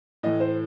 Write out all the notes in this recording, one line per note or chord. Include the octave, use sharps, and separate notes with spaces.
A2 E3 A3 D#5
C5